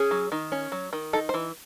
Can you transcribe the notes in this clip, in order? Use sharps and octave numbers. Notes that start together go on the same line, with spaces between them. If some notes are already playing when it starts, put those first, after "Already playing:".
Already playing: C#4 G#4
F#3
D#3
C#4
F#3
D#3
D#4 A4
C5
E3